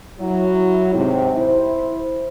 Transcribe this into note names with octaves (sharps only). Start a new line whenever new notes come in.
F#3 E4
G#2 C3
E4 C5